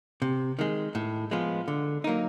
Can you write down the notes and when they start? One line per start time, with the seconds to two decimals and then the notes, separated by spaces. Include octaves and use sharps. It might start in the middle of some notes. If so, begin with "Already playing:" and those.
0.22 C3
0.59 D#3 G#3
0.95 A2
1.31 F3 G#3 B3
1.68 D3
2.04 F#3 A#3 D#4